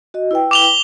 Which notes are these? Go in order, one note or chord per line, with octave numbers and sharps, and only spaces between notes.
F#4 D#5
E4 B4 G5
D6 F7 G7